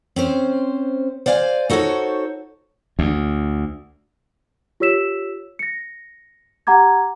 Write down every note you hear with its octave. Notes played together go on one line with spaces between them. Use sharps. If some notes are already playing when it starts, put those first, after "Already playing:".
C4 C#4 C5
C5 D5 F5 F#5 G#5
D#4 F#4 A4 C5 C#5
D2
F4 G4 C#5 E6 B6 E7
A#6 C#7
G4 F#5 A#5 D6 G#6